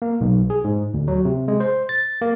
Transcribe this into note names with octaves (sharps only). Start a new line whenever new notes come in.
A#3
B1
G#4
G#2
D2
F#3
C3
G#3
C5
A6
A#3